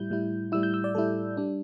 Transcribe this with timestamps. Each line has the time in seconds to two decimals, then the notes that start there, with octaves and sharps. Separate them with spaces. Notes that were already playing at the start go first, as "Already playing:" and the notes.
Already playing: A2 G3 E4 G6
0.10 A2 G3 E4
0.52 A2 G3 E4 E6
0.63 G6
0.74 E6
0.84 D5
0.95 A2 G3 E4 A4
1.37 G3 D4